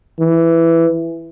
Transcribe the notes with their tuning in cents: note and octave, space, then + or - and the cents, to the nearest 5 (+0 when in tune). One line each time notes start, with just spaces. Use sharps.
E3 +10